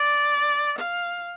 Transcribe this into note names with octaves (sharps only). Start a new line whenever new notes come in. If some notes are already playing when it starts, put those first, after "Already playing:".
Already playing: D5
F5